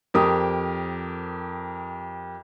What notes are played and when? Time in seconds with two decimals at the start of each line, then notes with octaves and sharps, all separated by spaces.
0.14 F2 G4 A#4 D#6